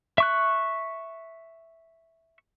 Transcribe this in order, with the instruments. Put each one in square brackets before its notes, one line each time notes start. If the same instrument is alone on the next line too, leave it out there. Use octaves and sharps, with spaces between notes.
[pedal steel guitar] E5 C#6 F#6